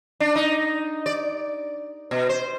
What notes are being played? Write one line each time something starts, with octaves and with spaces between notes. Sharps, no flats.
D4
D#4
D5
B2
C5